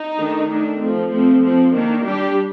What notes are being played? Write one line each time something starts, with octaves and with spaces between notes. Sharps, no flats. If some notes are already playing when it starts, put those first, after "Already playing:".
Already playing: D#4
D#3 A3 D4
D#3 A3 D4
F3 A3 C4
F3 A3 C4
F3 C4
D#3 A#3 D4
G3 D4 G4